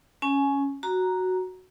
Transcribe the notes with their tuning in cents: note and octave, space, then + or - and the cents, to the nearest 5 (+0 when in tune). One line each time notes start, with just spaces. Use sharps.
C#4 +0 G#5 +20
F#4 +0 A#5 +0